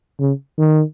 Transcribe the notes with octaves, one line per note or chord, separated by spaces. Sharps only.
C#3
D#3